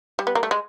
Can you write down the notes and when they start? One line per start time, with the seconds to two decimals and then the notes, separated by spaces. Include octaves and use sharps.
0.19 G3
0.27 B3
0.35 A#3
0.43 A3
0.51 G#3